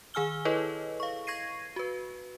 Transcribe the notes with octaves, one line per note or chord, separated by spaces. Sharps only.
D#3 G#4 G#5 E6 F6 G7
E4 G#4 A4 B4 C#5 D#5
F5 C#6
C#6 G#6 A#6 C7 D#7
F#4 B4